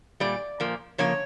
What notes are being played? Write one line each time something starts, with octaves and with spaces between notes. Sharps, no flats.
A#2 G3 D5
A#2 F3 A#3
C#3 F3 A#3 C#5